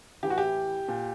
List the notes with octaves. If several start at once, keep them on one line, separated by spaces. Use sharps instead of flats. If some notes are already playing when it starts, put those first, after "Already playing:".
A2 E3 G4
F#4
G4
A#2